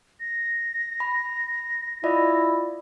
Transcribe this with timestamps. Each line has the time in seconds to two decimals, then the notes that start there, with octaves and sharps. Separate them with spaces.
0.20 A#6
1.00 B5
2.04 E4 F4 D5 D#5